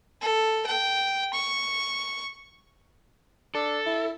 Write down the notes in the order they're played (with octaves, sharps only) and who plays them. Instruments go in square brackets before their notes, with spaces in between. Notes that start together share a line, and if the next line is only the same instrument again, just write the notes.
[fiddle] A4
G5
C#6
[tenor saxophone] D4 [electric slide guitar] A4
[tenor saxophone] E4